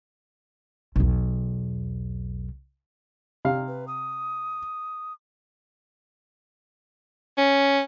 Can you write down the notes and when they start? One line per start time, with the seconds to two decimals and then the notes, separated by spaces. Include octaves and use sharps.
0.96 B1 E2
3.45 C3 F5
3.68 B4
3.88 D#6
7.38 C#4